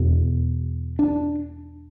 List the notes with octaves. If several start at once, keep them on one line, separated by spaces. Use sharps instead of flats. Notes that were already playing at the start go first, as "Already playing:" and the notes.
Already playing: E2 B2
D4